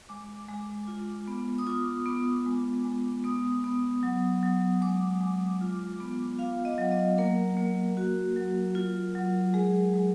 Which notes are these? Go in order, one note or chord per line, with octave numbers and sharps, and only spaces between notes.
G#3 D6
G#3
F4
B3
D#6
F4 D6
B3
G#3
G#3
B3 D#6
B3
F#3
F#3
G#3 D6
G#3
F4
B3
F4 F5
D#5
F#3
D#5
A#3 A#4
A#3
F#4
F#3
F4
F#3
G#3 G#4
G#3